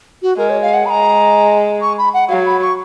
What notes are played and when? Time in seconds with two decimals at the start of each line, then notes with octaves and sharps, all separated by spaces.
0.22 F#4
0.37 G#3 A#4
0.50 C#5
0.62 F5
0.74 F#5
0.86 G#3 A#5 B5
1.82 C#6
1.98 B5
2.14 F#5
2.29 F#3 F5
2.46 B5
2.62 C#6